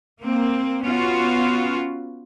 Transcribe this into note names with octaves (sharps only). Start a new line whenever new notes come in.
A#3 C4
B3 C#4 F4 F#4